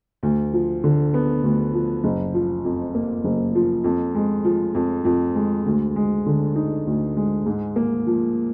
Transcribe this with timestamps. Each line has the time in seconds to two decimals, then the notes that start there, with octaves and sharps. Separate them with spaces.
0.23 D2
0.53 F3
0.84 D3
1.14 B3
1.43 D2
1.74 F3
2.04 F#1
2.34 F3
2.65 F2
2.94 A#3
3.24 F#1
3.55 F3
3.84 F2
4.15 G#3
4.45 F3
4.75 F2
5.05 F2
5.35 G#3
5.66 D2
5.96 G#3
6.26 D3
6.56 D#4
6.87 D2
7.17 G#3
7.46 G#2
7.76 A#3
8.07 F3